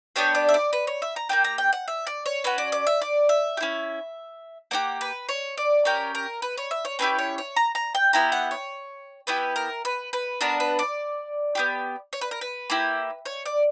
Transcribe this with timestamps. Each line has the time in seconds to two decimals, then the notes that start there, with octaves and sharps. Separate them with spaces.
0.16 B3 D4 G4 C#5
0.35 D5
0.49 E5
0.54 D5
0.73 B4
0.87 C#5
1.02 E5
1.16 A#5
1.29 A#3 C#4 G4 G5
1.44 A#5
1.58 G5
1.73 F#5
1.88 E5
2.07 D5
2.26 C#5
2.44 C#4 F#4 B4
2.58 D5
2.72 D5
2.87 E5
3.02 D5
3.29 E5
3.57 G4
3.60 C#4 E4
4.71 A#3 D4 G4 F#5
5.01 B4
5.29 C#5
5.58 D5
5.85 C#4 G4 A#4
6.15 A#4
6.42 B4
6.57 C#5
6.71 E5
6.85 C#5
6.99 A#3 C#4 E4 G4 B4
7.19 C#5
7.38 C#5
7.56 A#5
7.75 A#5
7.95 G5
8.13 B3 E4 G4 A#5
8.32 F#5
8.51 C#5
9.27 B3 E4 G4 B4
9.56 A#4
9.85 B4
10.13 B4
10.41 B3 D4 F#4 A#4
10.60 B4
10.79 D5
11.55 B3 E4 G4
12.13 C#5
12.21 B4
12.31 A#4
12.41 B4
12.70 A#3 E4 G4
13.26 C#5
13.46 D5